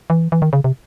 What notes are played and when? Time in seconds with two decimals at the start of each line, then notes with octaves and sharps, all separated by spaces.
0.10 E3
0.32 E3
0.42 D#3
0.53 C#3
0.64 C3